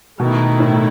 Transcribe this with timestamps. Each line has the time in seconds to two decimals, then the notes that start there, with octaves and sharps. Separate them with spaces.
0.20 B2 D#3 A3 E4
0.60 A2